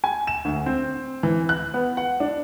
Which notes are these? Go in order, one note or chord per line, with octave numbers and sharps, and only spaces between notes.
G#5
E7
D2
C4
E3
F#6
B3
F#5
D4